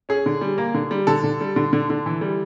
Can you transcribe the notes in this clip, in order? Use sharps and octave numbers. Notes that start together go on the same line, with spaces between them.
C#4 G#4
D3
G3
A#3
D3
G3
D3 A4
D3
G3
D3
D3
D3
E3
G3